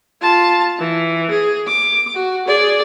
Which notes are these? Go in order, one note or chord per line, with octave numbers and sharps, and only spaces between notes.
F4 A5
E3
G#4
D6
F#4
G#4 D5